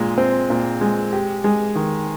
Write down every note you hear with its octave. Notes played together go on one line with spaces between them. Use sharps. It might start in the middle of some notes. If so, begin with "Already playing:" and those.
Already playing: A#2 G#3
C4
A#2
G#3
G4
G#3
D#3